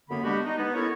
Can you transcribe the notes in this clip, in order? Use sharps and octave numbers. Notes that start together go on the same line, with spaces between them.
F#2 D3 A#3 B3 B5
G3 G#3 B3 D4 F#4 G4
D#4
B3
C#4 E4 A4 A#4 C#5